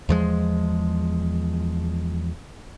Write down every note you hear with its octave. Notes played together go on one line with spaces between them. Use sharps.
E2 F3 G#3